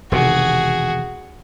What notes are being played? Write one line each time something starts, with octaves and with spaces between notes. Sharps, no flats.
E1 C3 D#3 F#4 G#4